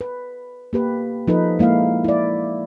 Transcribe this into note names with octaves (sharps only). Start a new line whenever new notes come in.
B4
A#3 G4 B4
F3 D#4 A4 B4
G#3 A#3 E4 F5
E4 D5